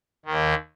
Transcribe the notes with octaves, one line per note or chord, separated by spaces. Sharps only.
D#2 D#3